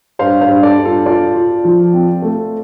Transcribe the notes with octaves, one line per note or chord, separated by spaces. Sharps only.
G2 C5 F5
C5 F5
G2
A4 D5
G2
F4 A4
F4 A4 D5
F4
F3
C4
A3